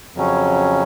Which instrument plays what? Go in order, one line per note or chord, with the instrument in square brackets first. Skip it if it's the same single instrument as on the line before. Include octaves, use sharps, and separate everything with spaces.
[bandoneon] F2 C#3 F#3 C#4